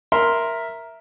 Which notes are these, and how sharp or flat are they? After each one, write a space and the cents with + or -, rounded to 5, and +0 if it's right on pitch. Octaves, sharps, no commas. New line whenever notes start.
A#4 +5 E5 +0 C6 +0